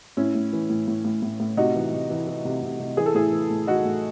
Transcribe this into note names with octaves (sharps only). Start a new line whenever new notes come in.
A2 C#4 E4
A2
E3
A2
A2
A2
A2
A2
C3 D#4 F#4
E3
C3
E3
E3
C3
C3
C3
E3 G#4
A4
A2 E4 G#4
E3
A2
E3 D#4 F#4
A2